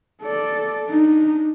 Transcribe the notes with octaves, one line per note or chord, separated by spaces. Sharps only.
A4 D5
D4 D#4